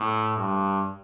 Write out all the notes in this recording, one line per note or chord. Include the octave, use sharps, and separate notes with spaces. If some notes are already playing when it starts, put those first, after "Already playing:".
Already playing: A2
G2